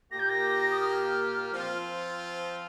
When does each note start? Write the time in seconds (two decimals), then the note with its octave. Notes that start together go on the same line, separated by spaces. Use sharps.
0.11 A#2 A#3 G4 A#6
0.20 G6
0.29 A#6
0.71 D#6
0.81 F6
1.51 F3 C4 F4